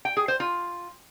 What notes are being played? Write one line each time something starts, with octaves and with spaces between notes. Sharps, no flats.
G5
G#4
C5
F4